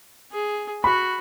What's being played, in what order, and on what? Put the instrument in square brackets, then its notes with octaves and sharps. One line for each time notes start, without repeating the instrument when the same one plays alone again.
[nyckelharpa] G#4
[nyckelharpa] F#4 [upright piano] B5